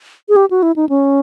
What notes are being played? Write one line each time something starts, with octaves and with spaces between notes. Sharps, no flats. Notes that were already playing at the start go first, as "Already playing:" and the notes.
G#4
G4
F#4
E4
D#4
C#4